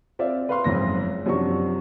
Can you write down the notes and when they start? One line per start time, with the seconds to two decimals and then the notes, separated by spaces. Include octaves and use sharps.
0.19 C4 F4 D5 E5
0.49 B4 F5 C6
0.64 F#1 F2 G#2 A#6
1.26 F#2 C3 F3 D4 F#4 C#6